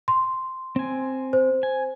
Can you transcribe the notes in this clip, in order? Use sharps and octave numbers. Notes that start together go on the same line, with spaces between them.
C6
C4 G#5
C5
G#5